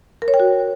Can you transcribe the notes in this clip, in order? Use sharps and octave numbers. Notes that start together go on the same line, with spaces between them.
A#4
C#5
G5
F#4